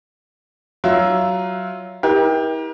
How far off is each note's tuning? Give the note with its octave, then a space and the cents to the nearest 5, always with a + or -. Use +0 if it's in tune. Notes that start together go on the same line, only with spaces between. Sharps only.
F#3 +15 F4 +0 E5 +0
E4 -40 G4 +20 A#4 +35